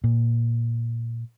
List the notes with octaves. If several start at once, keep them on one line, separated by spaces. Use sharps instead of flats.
A#2